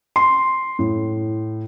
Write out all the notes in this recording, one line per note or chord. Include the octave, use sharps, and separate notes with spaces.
C6
A2